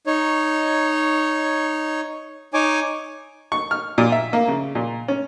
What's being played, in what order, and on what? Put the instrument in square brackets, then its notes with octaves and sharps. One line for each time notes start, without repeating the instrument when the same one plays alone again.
[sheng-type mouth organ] D#4 C#5
D#4 C#5 G#5 D6
[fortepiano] C#6
F6
A#2
E5
A#3
C#3
A#2
C#4